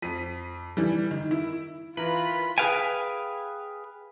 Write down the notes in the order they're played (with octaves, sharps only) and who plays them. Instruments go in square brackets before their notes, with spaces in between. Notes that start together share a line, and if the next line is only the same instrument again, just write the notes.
[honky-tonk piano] F2 B6 D#7
E3 G3
D#3
E4
[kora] E3 A#4 [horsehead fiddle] F4 [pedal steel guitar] B4 [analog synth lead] B5
[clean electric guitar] G#4 B4 F5 G5 G#5